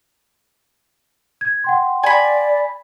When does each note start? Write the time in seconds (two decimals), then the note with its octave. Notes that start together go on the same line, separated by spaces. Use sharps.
1.41 G#6
1.64 F#5 G5 C6
2.03 D5 G#5 B5